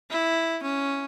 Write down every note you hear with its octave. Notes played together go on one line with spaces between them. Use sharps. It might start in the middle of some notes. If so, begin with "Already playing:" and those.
E4
C#4